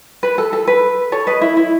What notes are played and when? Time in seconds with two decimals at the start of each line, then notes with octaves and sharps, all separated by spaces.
0.23 B4
0.38 A4
0.53 A4
0.67 B4
1.12 A4 C#5
1.27 B4 D#5
1.41 E4
1.57 E4